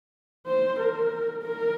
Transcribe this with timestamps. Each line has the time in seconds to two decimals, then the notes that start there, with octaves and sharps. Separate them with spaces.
0.47 C5
0.79 A#4
1.43 A#4